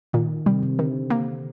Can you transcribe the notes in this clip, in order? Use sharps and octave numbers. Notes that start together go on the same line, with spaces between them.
A#2 D#3
C3 G3
C3
D3 D#3
A#3